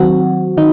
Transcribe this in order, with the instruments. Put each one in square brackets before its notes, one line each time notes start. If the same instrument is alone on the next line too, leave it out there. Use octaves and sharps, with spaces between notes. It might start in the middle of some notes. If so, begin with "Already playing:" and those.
Already playing: [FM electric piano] D#3 F#3 C4 F#4
D#3 D#4